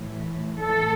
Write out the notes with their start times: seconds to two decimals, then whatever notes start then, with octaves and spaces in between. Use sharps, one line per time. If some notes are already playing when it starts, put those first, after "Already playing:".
Already playing: A2 E3
0.60 A2 E3 A4